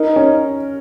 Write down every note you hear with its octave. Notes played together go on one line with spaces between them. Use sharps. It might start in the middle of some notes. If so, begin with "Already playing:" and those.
Already playing: D#4 A#4
C#4